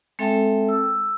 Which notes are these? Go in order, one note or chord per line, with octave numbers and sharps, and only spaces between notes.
G#3 C4 A4 E5 G5 A5
E6